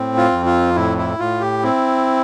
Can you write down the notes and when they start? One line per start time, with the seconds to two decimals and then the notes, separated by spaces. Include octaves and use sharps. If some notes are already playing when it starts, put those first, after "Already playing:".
Already playing: A2 C4
0.17 F4
0.32 F2
0.46 F4
0.76 A2 E4
0.98 E4
1.19 A2 F4
1.41 G4
1.63 C4 E4